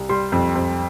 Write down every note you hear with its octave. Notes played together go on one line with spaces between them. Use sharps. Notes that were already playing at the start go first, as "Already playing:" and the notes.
Already playing: C2
G3 C6
F2
F2